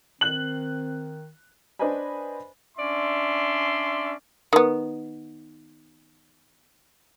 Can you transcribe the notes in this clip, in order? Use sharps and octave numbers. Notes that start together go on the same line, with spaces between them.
D#3 C4 F#6 F#7
D4 B4 C5 D#5 G#5 B5
C#4 D4 D5 E5 C6
D#3 B3